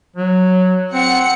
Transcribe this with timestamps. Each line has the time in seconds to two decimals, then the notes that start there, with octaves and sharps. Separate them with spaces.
0.16 F#3
0.93 C4 F#5 C#7